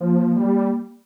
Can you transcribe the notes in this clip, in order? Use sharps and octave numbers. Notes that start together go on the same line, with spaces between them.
F3 A#3
G3